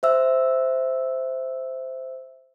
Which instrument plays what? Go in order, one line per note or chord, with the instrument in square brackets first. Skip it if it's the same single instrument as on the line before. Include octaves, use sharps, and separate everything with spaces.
[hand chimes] C5 E5 E6